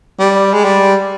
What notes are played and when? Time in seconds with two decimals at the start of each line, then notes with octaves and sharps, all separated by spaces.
0.19 G3
0.53 G#3
0.65 G3